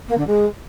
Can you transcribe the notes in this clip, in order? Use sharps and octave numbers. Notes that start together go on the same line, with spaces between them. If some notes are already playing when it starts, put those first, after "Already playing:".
A#3
D3
G#3